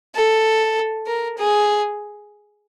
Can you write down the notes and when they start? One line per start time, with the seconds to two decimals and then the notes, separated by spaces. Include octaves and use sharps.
0.15 A4
1.07 A#4
1.38 G#4